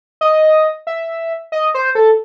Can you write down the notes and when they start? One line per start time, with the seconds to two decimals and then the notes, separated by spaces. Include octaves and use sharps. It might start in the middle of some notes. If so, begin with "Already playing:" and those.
0.21 D#5
0.87 E5
1.52 D#5
1.74 C5
1.95 A4